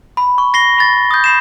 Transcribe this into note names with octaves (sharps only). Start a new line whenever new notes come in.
B5
C#6
A#6 C7 G7
B5 A6
D#6 G6
B5 C7 E7